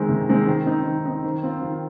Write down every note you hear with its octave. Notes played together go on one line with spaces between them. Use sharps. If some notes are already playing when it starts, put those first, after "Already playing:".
Already playing: D#3 G#3 C4
C3
D#3 G#3 C4
D#3
C4 D#4
D#3
C4 D#4
D#3
C4 F4
D#3